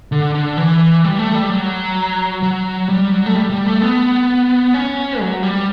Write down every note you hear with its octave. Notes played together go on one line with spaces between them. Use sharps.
D3
D3
E3
G3
A3
G3
F#3
F#3
G3
F#3
A3
G3
G3
A3
B3
C#4
F#3
G3